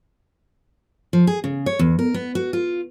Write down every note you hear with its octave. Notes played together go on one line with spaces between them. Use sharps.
F3
G#4
C#3
C#5
E2
A#4
B3
F#4
F4